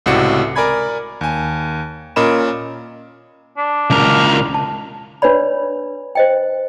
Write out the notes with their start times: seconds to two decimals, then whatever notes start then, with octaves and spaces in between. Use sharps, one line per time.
0.06 C#2 A2 C3 F#4 D5 C#7
0.56 A#4 D5 G#5 B5 G#6
1.21 D#2 G#5
2.16 A#2 C#4 A#4 D#5 B5 E7
3.57 D4
3.90 C#2 A#4
4.54 A5
5.22 D4 B4 C#5 D5 B5
6.15 C5 D#5 G5